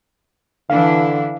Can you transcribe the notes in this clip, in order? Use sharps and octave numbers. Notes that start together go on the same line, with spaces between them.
D3 E3 D4 E4 F5